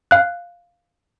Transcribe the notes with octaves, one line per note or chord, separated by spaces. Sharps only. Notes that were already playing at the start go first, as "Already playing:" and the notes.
F5 F#6